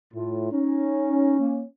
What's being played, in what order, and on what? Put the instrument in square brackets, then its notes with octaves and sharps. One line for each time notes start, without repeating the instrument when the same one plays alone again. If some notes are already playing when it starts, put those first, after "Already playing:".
[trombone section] A2 [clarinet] F4
[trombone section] C#4 [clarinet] D#4
[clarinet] A#3